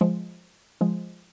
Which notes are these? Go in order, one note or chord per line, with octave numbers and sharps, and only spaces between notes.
F3 G#3
F3 G#3